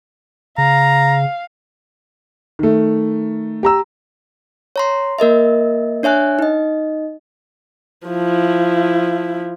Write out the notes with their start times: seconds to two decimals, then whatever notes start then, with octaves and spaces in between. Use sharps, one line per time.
0.58 C#3 F5 A#5
2.59 D#3 A3
3.63 G4 A#5 E6
4.76 C#5 A#5 C6
5.19 A#3 A#4 D#5 E5
6.03 D4 C#5 E5 G#5 F#6
6.39 D#4 D#5
8.07 F3 E4